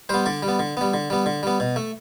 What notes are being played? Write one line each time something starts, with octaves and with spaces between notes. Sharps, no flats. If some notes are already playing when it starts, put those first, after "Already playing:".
G3 B3 C5
D3 D5
G3
B3
D3
G3 B3
D3
G3 B3
D3
G3 B3
B2
A3